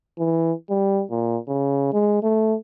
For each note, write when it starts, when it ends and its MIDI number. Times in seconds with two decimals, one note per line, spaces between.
0.19 0.53 52
0.70 1.03 55
1.11 1.37 46
1.48 1.91 49
1.93 2.18 56
2.23 2.55 57